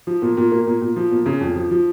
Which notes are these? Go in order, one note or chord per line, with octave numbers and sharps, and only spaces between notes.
F3
A#2
A#2
A#3
A#2
A#2
F3
A#2
C#3
F2
F3
F3